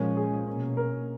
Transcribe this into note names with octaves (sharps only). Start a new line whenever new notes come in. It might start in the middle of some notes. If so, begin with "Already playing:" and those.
Already playing: A#2 F3 G#3 C#4 A#4
G#4
B2 A#3 C#4
A#4